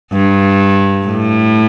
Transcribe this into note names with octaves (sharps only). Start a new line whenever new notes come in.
G2
A2